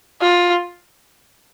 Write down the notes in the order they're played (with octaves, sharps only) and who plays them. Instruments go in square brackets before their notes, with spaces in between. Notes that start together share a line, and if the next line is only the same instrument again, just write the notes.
[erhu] F4